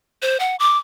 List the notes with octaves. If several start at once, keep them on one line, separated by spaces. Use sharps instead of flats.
C5
F#5
D6